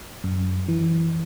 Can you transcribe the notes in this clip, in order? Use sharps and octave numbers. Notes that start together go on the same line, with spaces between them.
F#2
E3